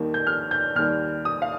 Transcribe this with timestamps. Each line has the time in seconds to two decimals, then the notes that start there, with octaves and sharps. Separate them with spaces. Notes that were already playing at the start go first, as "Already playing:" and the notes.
Already playing: D#2 D#3 G3 A#3 D#4
0.14 G6
0.27 F6
0.51 G6
0.75 D#2 D#3 G3 F6
1.25 D#6
1.42 F5